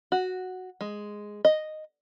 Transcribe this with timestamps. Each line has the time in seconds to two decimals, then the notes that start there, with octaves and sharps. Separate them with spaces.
0.12 F#4
0.81 G#3
1.45 D#5